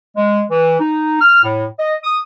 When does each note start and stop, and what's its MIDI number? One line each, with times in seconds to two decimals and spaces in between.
0.17 0.43 56
0.51 0.78 52
0.80 1.18 63
1.21 1.41 89
1.44 1.65 45
1.79 1.95 75
2.04 2.20 87